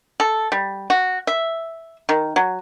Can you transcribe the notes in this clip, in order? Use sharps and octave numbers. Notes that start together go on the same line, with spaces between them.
A4
G3
F#4
E5
D#3
F#3